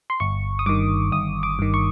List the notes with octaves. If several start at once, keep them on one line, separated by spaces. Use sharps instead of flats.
C6
G1 C#6
D#6
G2 D#3 D6
G1 D#6
D6
G2 D#3
C#6